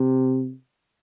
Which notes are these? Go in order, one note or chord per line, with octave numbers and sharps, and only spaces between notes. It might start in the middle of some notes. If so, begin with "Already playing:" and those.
Already playing: C3